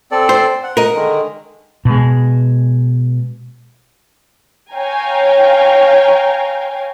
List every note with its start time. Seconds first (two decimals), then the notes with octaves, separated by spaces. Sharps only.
0.12 C4 A4 D5
0.29 C5
0.63 F#5
0.77 A#4 D#5
0.95 D3 D#3 G#3
1.85 B2 G#3
4.72 C#5 F5 G5 G#5 A#5